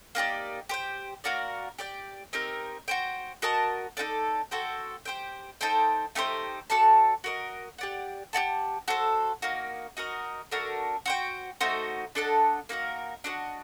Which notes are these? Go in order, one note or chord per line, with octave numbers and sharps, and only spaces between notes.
A#3 D#4 G4 D5
G4 C5 G5
A#3 F#4 A#4 D5
G4 D5 G5
C4 D#4 G4 A#4
F#4 C5 G5
F#4 A#4 D#5 A5
D#4 F#4 A4 D5
F#4 A4 C5 G5
G4 C5 G5
D#4 A4 C5 G5
A3 D#4 G4 C5
F#4 A4 D5 A5
F#4 A#4 D#5
G4 D5 F#5
G4 D5 F#5 A5
F#4 A4 C5
A#3 D#4 F#4
D#4 F#4 A#4 D#5
A3 D4 F#4 A#4
F#4 C5 G5
A3 D#4 F#4 C5
D4 A4 D#5 F#5
A#3 D#4 F#4 A#4
D4 F#4 C5 D#5